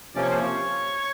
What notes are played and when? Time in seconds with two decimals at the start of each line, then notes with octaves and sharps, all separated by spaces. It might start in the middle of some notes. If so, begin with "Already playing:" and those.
0.15 C3 F3 A#3 C#4 D5
0.23 C#5
0.30 C5
0.37 C#5